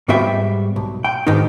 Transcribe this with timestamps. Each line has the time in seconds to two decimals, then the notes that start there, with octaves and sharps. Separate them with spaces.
0.08 G#2 G3 B3 F#4 E5 G5
0.76 B1
1.04 G5
1.27 G#2 B2 D#3 B3 D#4